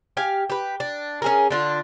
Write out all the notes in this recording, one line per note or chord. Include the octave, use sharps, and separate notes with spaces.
G4 F5 G#5
G4 B4
D4
C#4 G#4 A#4
D3 D4 F4